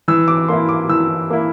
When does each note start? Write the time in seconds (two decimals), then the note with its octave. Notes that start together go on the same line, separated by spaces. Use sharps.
0.08 E3 E6
0.28 D6
0.48 A#3 E4 C6
0.69 D6
0.89 E3 E6
1.30 A#3 E4